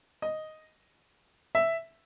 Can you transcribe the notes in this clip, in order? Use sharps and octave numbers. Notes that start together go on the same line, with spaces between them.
D#5
E5